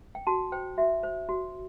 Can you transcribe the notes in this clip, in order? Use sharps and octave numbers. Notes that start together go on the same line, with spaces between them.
G5
F#4 A5
C5 G5
F#4 E5
C5
F#4